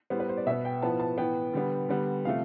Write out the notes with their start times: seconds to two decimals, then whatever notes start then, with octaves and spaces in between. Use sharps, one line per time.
0.10 A2 G3 B3 C5
0.20 B4
0.29 C5
0.37 D5
0.46 B2 B3 E5
0.65 G5
0.82 A2 F3 B3 A5
1.00 A5
1.18 A2 E3 B3 G5
1.53 D3 G3 B3
1.89 D3 G3 B3
2.25 C3 F3 A3 F5